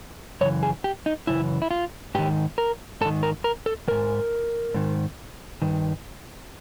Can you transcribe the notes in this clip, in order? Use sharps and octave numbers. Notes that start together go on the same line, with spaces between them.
F#2 C#3 E3 C#5
G#4
G4
D#4
F#2 C#3 E3 E4
E4
F4
G#2 D#3 G4
A#4
G#2 D#3 A4
A#4
A#4
A4
G#2 D#3 A#4
G#2 D#3
G2 D#3